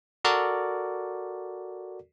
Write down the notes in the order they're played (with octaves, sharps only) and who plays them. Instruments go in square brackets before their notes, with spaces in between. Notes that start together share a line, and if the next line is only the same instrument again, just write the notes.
[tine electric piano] F#4 A4 A#4 D5